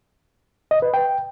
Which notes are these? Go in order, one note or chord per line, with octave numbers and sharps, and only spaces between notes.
D#5
B4
G5